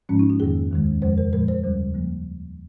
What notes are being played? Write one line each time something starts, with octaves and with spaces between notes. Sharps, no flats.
G#2 F3 G#3 C#4
D#4
F4
F2 D#3 A#3 G#4
D#2 D#3 G#3
F2 C#3 F3 G#3 C5
A#4
A#2 F3 G#3 A#4
C5
D#2 C#3 G3
F3 A#3